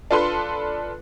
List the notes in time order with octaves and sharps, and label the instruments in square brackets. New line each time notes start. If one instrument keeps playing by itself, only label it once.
[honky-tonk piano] D4 F4 A4 B4 C6